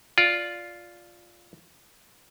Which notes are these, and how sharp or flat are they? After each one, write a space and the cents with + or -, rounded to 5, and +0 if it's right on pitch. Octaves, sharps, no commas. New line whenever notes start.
F4 +0 D5 +0